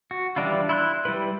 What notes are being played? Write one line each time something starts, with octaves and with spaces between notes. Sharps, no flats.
F#4
E3 G3 D4 E4 F4
E4 C6 F#6
G3 E4 B4